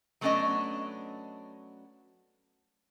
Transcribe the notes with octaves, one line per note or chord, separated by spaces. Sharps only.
F#3 A3 B3 C#4 D4 D#5